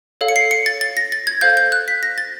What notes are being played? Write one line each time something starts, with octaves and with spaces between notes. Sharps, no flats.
A4 C#5 F5
C#7
C7
C#7
A6
A6
A#6
A6
G#6
A4 C5 F5 G6
G6
F#6
B6
A#6
A6